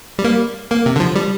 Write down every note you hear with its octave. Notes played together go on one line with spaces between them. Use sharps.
G3
A#3
A#3
C3
D3
F3
G3